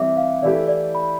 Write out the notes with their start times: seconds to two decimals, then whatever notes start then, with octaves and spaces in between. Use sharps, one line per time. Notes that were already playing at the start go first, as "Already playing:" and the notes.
Already playing: E3 G3 C4 E5 D6
0.17 F5
0.42 E3 A3 E4 G4 D5
0.68 D5
0.95 B5